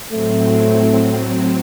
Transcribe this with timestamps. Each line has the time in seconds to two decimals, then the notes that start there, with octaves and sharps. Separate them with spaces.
0.12 A2 F#3 A3 C4